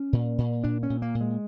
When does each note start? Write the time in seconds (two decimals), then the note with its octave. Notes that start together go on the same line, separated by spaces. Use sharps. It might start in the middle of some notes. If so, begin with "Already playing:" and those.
Already playing: C#4
0.13 A#2
0.38 A#2
0.64 A#2 D4
0.83 C#4
0.90 A#2
1.02 A#3
1.15 A#2
1.21 G#3